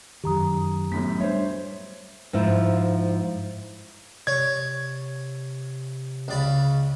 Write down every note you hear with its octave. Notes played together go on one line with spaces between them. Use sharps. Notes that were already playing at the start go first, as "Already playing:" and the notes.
F#2 D#3 G4 A#5 D#6
F#2 A2 B3 B6
G3 D4 C5 C#5 E5
G#2 F3 E4
C3 C#5 D5 G#6
C#2 C#3 D5 B5